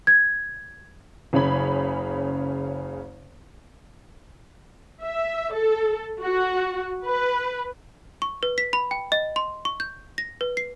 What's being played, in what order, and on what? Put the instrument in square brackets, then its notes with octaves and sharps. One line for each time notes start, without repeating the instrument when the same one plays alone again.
[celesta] G#6
[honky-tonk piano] F#1 C#3 C#4 B5 G#6
[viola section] E5
A4
F#4
B4
[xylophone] C#6
B4
B6
B5
G5
D#5
C6
C#6
G6
A#6
B4
C7